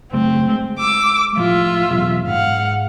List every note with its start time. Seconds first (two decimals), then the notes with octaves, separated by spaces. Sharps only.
0.13 F#1 A3 C4
0.49 G#3
0.78 D6 E6
1.37 A2 F3 F4 E5
1.90 E2 B2 F#3
2.27 G#2 F5 F#5